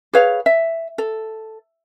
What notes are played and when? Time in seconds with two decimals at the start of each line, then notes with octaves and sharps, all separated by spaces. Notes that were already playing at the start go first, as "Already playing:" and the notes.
0.13 G#4 B4 C#5 F5
0.46 E5
0.98 A4